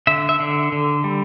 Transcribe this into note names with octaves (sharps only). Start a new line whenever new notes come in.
D3 E5
E5
D3
D3
G3